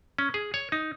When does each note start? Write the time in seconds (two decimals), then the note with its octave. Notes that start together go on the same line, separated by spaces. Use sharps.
0.18 C#4
0.34 G#4
0.54 C#5
0.72 D#4